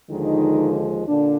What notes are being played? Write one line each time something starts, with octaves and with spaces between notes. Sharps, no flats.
D#2 D3 D#3 F3 G#3 D#4
A#2 D3 D4